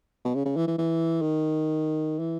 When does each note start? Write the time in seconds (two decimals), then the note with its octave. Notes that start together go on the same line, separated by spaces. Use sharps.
0.25 B2
0.35 C#3
0.45 C#3
0.56 E3
0.67 E3
0.78 E3
1.22 D#3
2.19 E3